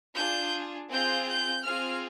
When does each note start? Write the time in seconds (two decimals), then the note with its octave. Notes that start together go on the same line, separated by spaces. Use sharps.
0.16 D4 F4 G#4 G6
0.90 C4 F4 G#4 G6
1.27 G6
1.64 C4 F4 G#4 F6